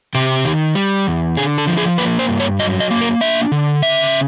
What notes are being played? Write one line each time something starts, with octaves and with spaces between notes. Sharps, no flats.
C3 G4
D#3
G3
E2
D3 G#4
A4
F3
G#4
A#3 B4
C5
G2
C#5
F#3 D#5
D#5
A#3
A#4
D4 E5
D3
C#3 E5